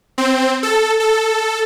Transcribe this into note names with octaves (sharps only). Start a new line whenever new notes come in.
C4
A4
A4